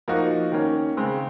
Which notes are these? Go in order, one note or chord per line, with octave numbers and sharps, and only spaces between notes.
F3 A#3 D#4 F#4
D#3 A#3 C#4
C#3 G#3 C4